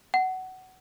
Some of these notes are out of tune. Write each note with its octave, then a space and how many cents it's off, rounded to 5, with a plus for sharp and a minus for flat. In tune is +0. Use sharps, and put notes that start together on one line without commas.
F#5 +20